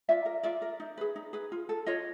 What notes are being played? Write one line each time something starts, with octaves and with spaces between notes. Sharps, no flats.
F4 D5 E5
A#4
F4 D5 E5
A#4
D#4
G#4 B4
D#4
G#4 B4
F4
A4
F4 C#5 D#5